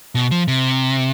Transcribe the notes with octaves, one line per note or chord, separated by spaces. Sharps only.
B2
F3
C3